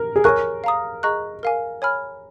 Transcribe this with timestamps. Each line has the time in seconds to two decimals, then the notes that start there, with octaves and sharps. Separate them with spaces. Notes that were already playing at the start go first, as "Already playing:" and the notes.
Already playing: A#4
0.16 G#4
0.24 A#4 C#5 G#5 C#6 F#6
0.64 F5 A#5 D#6
1.03 G#4 D#5 A#5 C#6 F#6
1.43 A#4 F5 G#5
1.82 C#5 G#5 B5 F6